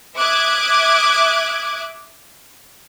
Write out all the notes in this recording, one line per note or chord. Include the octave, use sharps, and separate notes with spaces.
E5 D6 D#6 F#6 G#6